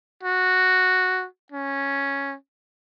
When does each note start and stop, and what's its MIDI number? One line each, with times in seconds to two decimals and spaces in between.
0.23 1.26 66
1.52 2.36 61